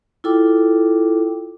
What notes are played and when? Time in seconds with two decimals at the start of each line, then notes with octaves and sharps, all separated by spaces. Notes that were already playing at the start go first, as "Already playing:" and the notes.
0.24 E4 F4 A4 G5 D6